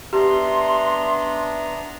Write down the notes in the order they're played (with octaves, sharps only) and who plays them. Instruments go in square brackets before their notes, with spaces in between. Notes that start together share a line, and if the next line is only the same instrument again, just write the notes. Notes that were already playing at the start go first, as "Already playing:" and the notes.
[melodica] B3 D4 A#5 [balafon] G4 [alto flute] E5 [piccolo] C6